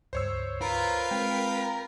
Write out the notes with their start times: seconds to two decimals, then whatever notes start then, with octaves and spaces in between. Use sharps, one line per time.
0.13 C#2 G2 C5 C#5 E6
0.62 F4 A#4 B4 B5
1.11 G#3 C4 G5